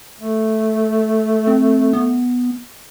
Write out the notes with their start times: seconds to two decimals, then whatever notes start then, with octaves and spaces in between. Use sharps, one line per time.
0.21 A3
1.47 C4
1.93 B3